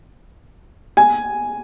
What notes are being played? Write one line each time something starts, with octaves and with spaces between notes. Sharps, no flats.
G#5